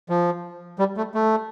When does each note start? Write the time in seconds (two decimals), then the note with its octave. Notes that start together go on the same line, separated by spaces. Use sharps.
0.09 F3
0.79 G3
0.97 A3
1.15 A3